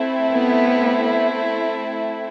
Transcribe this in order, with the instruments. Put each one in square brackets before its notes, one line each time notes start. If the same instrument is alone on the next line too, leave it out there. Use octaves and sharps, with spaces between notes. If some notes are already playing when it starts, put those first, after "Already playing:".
Already playing: [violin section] A3 C4 E4
[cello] B3